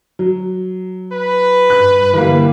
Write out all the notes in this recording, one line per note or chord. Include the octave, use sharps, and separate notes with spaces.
F#3
B4
G2 F#6
D3 E3 G3 A#3 B4